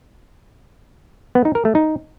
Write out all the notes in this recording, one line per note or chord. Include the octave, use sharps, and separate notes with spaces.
B3
D#4
A#4
A3
D#4